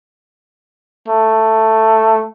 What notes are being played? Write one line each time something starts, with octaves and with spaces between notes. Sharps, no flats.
A3